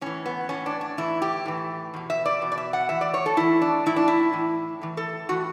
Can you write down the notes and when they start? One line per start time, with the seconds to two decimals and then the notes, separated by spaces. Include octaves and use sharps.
0.01 A2 E3 C#4
0.26 B3
0.49 A2 E3 C#4
0.66 D4
0.81 D4
0.97 A2 E3 E4
1.22 G4
1.46 A2 E3
1.94 E2 B2
2.10 E5
2.26 D5
2.41 E2 B2
2.52 D5
2.58 E5
2.73 F#5
2.89 A2 E3 E5
3.01 D5
3.14 C#5
3.26 A4
3.37 A2 E3 E4
3.62 D4
3.86 A2 E3 E4
3.96 D4
4.08 E4
4.33 A2 E3
4.81 A2 E3
4.97 A4
5.29 A2 E3 F#4